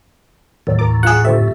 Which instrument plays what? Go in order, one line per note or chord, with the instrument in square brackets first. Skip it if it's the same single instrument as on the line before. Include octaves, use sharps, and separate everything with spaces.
[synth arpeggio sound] D#2 D#3 F#3 [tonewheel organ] A2
[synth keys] D#2 E3 A#5 [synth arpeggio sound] A#4 D6
[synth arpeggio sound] G2 F4 E6 [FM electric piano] G#4 F#5
[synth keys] D3 F4 G4 [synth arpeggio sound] A3 C4 [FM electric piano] E5
[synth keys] F#2